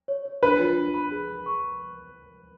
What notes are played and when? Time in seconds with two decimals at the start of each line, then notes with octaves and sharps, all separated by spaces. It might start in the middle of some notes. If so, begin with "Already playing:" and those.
0.08 C#5
0.26 C#5
0.43 D4 B4
0.59 F4
0.78 D4
0.94 B5
1.11 G#4
1.28 B5
1.46 C#6